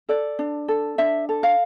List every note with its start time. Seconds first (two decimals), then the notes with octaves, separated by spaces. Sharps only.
0.09 A4 D5
0.39 D4
0.68 A4
0.98 D4 E5
1.29 A4
1.43 F5